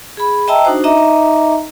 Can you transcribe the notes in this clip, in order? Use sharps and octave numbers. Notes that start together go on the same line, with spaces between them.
G#4 B5
D#5 E5 G5 A5 A#5 E6
D4 D#4 F#4 C5
D#4 D#5 E5 A#5 D6